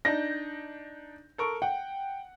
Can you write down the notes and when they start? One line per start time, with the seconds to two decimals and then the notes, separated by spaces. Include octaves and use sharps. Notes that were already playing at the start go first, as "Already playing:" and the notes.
0.05 D4 D#4 G6 A#6
1.38 A4 A#4 C#6
1.62 F#5 G5